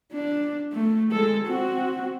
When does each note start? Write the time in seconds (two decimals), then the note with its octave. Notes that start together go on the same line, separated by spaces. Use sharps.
0.13 D4
0.73 A3
1.11 G#3 A4
1.47 C4 F#4